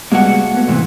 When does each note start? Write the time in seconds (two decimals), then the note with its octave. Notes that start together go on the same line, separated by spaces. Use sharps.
0.11 G3 G#3 A#3 B3 F#4 F#5
0.55 A3 B3
0.68 G#2 C3 E3